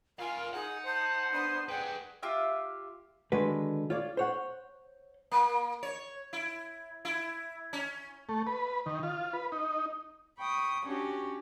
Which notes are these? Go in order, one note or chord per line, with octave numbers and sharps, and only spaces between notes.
F4 A#4 F5 G#5
D#4 G#4 F#5
C5 A5
B3 D4 D#6
G#4 B4 D5 F#5 G5
F4 G4 E5
D3 D#3 G#3 F#4 B4
F4 C#5 D5
C5 C#5 F#5
A#3
C#5
E4
E4
C#4
A3
B4
D#3
F4
B4
D#4
G5 B5 C#6 D#6
C#4 D4 F#4 G4 C#5